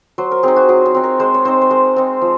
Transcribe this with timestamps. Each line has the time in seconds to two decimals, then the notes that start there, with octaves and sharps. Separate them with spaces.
0.18 F#3 C5
0.31 A#4
0.43 C4 D#4 G#4
0.56 F#4
0.69 F#3 G#4
0.86 G#4
0.95 C4 D#4
1.03 A#4
1.20 G#3 C5
1.34 C#5
1.45 C4 D#4 C5
1.61 C5
1.70 G#3 A#4
1.96 C4 D#4
2.22 F3